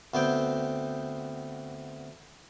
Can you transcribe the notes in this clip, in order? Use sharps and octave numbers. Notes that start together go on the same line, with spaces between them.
D2 B3 C4 G5